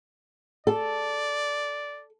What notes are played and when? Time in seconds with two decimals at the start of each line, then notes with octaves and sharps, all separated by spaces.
0.67 A4 D5